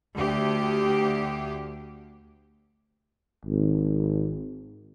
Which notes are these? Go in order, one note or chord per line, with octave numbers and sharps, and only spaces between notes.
D2 G4
G#1